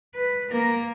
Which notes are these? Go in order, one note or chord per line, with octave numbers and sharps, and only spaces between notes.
B4
A#3 A#4